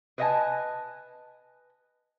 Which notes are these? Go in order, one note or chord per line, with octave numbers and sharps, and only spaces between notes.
B4 C5 D#5 E5 G#5 A5